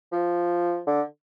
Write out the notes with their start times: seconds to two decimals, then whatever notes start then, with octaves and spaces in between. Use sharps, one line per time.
0.12 F3
0.87 D3